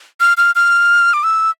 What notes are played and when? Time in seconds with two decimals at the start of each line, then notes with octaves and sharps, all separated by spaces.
0.20 F6
0.37 F6
0.55 F6
1.14 D6
1.23 E6